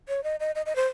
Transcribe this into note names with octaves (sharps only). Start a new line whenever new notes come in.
C#5
D#5
D#5
D#5
D#5
C5